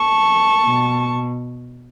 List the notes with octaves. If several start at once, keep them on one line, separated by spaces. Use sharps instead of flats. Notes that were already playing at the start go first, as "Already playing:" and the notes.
Already playing: A5 C#6
B2